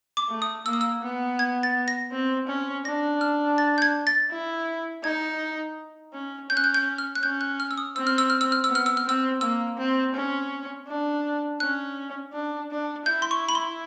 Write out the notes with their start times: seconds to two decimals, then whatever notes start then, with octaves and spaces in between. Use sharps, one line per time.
0.17 D6
0.29 A3
0.42 D#6
0.66 A#3 E6
0.73 D#6
0.81 E6
1.03 B3
1.39 G#6
1.63 A6
1.88 A#6
2.11 C4
2.48 C#4
2.85 D4 A#6
3.21 F6
3.58 A6
3.78 G6
3.82 G#6
4.07 A6
4.30 E4
5.03 D#4 G#6
6.13 C#4
6.50 C#4 G6
6.57 F#6
6.64 G6
6.74 G6
6.98 F6
7.15 F#6
7.23 C#4 G6
7.41 F#6
7.60 F6
7.71 E6
7.78 D#6
7.96 C4 E6
8.07 F6
8.18 E6
8.30 F6
8.41 E6
8.52 F6
8.64 B3 E6
8.75 F6
8.86 E6
8.97 F6
9.05 C4 E6
9.41 A#3 E6
9.78 C4
10.15 C#4
10.87 D4
11.60 C#4 F#6
12.33 D4
12.71 D4
13.06 E4 G6
13.22 C6
13.31 C#6
13.49 B5
13.55 C6